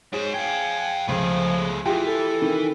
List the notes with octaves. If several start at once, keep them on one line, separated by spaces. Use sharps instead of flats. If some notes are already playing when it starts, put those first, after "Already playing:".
G#2 G#4 C5 C#5
F5 G5 G#5
C#2 C#3 F3 A3 G#4
E3 F4 G4 G#4
A4
D#3